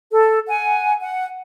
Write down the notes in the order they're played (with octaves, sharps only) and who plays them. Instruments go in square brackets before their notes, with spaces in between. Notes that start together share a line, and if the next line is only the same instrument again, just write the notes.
[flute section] A4
F#5 G#5
F#5